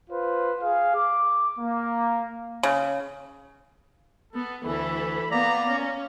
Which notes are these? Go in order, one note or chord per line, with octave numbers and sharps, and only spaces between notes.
F4 B4 C5
G#4 F5
D6
A#3
C#3
B3 A4
D2 E3 A4 B5
A#3 B3 D5 A#5
C#4